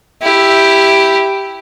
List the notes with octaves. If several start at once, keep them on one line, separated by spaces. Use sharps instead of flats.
E4 G4